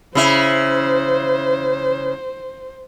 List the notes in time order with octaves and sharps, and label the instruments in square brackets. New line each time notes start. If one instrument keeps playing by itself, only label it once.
[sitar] C#3 E4 [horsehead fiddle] C5